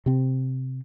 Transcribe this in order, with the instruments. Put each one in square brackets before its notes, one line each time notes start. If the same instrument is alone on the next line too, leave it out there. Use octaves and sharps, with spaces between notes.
[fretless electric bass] C3 C4